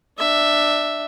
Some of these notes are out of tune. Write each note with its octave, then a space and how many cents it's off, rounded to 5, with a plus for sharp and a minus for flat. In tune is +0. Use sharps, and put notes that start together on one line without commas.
D4 +15 E5 +0